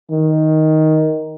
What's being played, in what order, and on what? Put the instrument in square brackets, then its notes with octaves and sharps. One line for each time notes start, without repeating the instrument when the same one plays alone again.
[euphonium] D#3